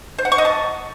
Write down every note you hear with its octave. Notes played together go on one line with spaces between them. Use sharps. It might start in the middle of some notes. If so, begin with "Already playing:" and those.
C5
F#5
C#6
D#5
A5